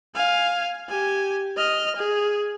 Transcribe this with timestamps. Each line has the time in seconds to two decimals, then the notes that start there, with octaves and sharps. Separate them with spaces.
0.15 F5 G#5
0.89 G4 G#5
1.56 D#5 F6
1.96 G#4